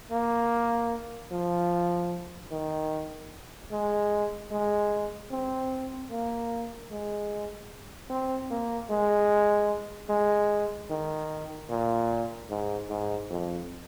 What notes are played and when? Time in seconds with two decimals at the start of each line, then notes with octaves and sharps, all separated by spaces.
0.11 A#3
1.31 F3
2.51 D#3
3.71 G#3
4.51 G#3
5.31 C4
6.11 A#3
6.91 G#3
8.10 C4
8.51 A#3
8.90 G#3
10.10 G#3
10.90 D#3
11.70 A#2
12.50 G#2
12.90 G#2
13.30 F2